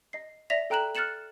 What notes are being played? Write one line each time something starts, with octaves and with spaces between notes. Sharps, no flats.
D#5 C7
D5 E5 A#6 B6 F7
A4 G5 A#5 F#6 E7 F#7
F6 F#6 A6 C#7 E7 F#7